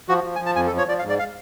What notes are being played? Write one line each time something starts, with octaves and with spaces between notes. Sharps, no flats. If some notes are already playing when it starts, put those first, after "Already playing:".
F3 F#4
F3
G#5
F3
A5
F2 G#5
A4
F3
C#5
F3 D5
F5
G#2
D5
F5